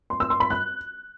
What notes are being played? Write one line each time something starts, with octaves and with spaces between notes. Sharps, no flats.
C6
E6
C6
B5
F#6